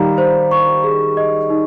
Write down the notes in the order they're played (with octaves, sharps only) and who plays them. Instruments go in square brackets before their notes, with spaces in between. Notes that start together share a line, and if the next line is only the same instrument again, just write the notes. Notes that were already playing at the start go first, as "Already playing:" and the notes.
Already playing: [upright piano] D#3 G3 [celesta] F5 A#5
[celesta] C5
C#6
G#4
D#5
D#4